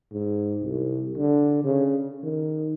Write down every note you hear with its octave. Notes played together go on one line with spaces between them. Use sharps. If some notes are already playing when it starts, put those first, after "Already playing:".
G#2
C2
D3
C#3
D#3